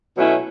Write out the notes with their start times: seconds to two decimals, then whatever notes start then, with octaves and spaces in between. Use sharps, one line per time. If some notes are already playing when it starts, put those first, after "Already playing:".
0.17 B2 F#3 A3 C#4 E4